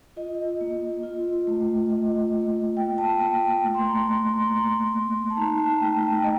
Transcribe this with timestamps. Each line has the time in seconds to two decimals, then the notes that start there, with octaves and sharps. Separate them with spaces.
0.17 F4 D#5
0.61 A#3
1.03 F4
1.47 A3
1.90 F4 D#5
2.34 A#3
2.77 A#3 G5
2.98 A5
3.21 A#3 G5
3.64 A3
3.74 C6
3.85 A#5
4.07 A3 A#5
4.29 C6
4.50 A#3
4.94 A#3
5.30 A5
5.37 D#4 A#5
5.59 A5
5.80 A3 G5
6.03 G5
6.24 D#5